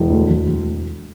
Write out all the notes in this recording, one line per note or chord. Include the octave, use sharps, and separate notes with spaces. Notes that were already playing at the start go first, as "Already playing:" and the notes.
Already playing: E1
D2
E1
E1